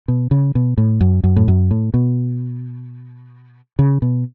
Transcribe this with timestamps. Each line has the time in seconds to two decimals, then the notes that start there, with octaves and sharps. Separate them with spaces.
0.08 B2
0.31 C#3
0.55 B2
0.78 A2
1.01 F#2
1.24 F#2
1.36 A2
1.48 F#2
1.71 A2
1.94 B2
3.79 C#3
4.02 B2